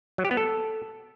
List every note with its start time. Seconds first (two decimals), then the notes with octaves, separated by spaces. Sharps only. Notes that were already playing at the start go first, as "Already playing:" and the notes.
0.18 F#3
0.25 G4
0.31 B3
0.37 A4